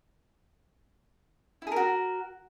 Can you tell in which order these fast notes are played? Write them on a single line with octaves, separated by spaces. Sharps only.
E4 G#4 A#4 F#4